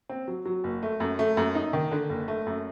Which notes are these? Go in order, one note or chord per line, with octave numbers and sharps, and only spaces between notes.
C4
F#3
F#3
F#1
A3
F#2
A3
F#2
D#4
D#3
D3
F#1
A3
F#2